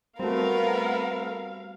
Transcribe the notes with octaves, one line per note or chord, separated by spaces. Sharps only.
G3 A3 B3 C4 F#4 A#4 F5